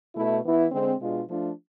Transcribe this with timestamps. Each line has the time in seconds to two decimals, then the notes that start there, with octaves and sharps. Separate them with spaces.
0.16 B2 A3 E4
0.44 E3 B3 E4
0.71 D3 G#3 C4
1.00 B2 G#3 D4 F4
1.28 F3 A3 D4 F4